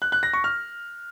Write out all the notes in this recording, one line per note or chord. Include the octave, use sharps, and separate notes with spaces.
F#6
F#6
A#6
C#6
F6